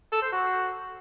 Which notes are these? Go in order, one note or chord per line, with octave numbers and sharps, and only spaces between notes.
A4
C5
F#4